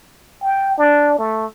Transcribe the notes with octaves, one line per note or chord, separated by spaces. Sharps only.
G5
D4
A3